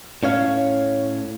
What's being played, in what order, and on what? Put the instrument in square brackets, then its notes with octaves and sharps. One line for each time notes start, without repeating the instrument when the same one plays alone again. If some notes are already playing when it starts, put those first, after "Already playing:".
[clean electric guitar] A2 C#4 C#5 F5